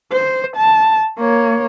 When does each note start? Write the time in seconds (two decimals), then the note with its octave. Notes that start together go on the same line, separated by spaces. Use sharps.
0.12 C5
0.57 A5
1.18 A#3 C#5